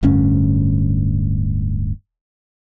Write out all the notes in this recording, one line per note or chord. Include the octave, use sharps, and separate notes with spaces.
D1 D2 G2 C#4